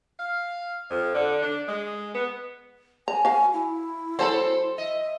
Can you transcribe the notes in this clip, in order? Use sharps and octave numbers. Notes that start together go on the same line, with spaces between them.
F5
F2
D3
D4
G#3
B3
G#5 A#5
F#4 F5
E4
F#3 C4 A4 C5 A5 B5
D#5 E5